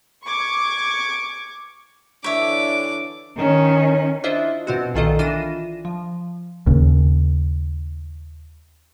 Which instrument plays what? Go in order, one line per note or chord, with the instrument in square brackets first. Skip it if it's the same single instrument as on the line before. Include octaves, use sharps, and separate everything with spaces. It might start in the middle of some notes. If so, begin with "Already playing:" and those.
[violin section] C#6 D6 G#6
[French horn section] D3 E3 D4 [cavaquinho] C#5 E5 [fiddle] D6
[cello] D#3 C#4
[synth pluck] D4 E4 F4 C5 D#5 E5
B2 C4 F#4
B1 A#2 D#3 F4 A4 D#5
E3 D4 F4 A#6 D#7 E7
F3
[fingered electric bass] D#2 C#3